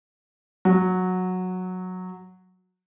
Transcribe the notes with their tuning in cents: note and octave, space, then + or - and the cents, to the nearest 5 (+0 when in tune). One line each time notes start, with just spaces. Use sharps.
F#3 -10